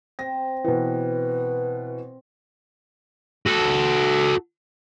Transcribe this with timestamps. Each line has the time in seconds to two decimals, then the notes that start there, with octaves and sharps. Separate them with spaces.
0.19 C4 A#6
0.64 B2 E3 B4
3.47 F#4 A4